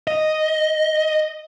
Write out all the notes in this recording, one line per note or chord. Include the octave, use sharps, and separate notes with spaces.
D#5